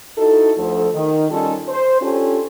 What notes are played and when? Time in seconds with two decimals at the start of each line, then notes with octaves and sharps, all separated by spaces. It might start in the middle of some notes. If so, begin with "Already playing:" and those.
0.18 D#4 E4 F#4 A4
0.57 D2 F3 A4
0.94 D#3
1.31 G3 C#4 D#4 F4 A4
1.69 C5
2.01 C#4 D4 F4 G4 A4